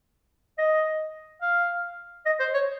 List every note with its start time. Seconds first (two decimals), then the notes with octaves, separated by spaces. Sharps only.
0.58 D#5
1.41 F5
2.25 D#5
2.39 C5
2.54 C#5